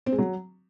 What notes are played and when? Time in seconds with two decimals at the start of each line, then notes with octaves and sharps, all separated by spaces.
0.06 C4
0.12 G#3
0.18 F#3